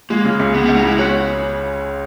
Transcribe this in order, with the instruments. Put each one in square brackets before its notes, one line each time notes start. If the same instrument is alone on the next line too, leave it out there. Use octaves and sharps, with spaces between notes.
[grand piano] G#3 [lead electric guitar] A#3
[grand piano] C#3
C#2
[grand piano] C#3 [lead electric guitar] B3
[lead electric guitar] A#3
B3
[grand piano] C#2
[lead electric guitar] D#4
[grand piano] G#3 [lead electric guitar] E4
[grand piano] C#4 [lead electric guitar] F#4